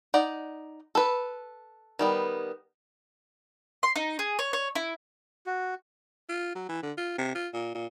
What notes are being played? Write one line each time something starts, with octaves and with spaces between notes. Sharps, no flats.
D#4 D5 F#5
A4 B4
D#3 G3 B3
C6
D#4
G#4
C#5
C#5
E4
F#4
F4
F#3
E3
D3
F4
C3
F4
A#2
A#2